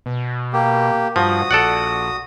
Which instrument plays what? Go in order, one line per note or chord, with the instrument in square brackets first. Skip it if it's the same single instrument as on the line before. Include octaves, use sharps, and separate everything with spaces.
[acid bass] B2
[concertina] A#3 G4
[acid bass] G2 [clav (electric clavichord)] F3 [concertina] F#4 D#6
[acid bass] A#1 [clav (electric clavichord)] A4 D5 F#5